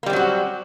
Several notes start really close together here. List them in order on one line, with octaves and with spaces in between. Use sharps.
A#3 G3 C4 F#3 F#4